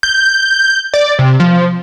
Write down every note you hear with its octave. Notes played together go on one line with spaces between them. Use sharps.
G6
D5
C3
F3